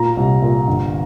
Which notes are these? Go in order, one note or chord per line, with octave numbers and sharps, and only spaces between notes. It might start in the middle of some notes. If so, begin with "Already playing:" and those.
Already playing: A#2 A#5
C2
A#2
G1